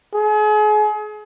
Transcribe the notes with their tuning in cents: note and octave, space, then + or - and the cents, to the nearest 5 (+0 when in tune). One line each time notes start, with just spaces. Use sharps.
G#4 +35